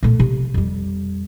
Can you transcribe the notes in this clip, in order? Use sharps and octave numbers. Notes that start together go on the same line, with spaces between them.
A#2 A3
C3
F2 G3